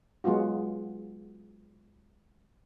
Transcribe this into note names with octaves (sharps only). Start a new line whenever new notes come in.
F#3 G#3 B3 F4 F#4